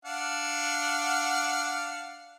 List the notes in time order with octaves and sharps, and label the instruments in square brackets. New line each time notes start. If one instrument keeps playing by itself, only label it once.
[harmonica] D4 F5 F#5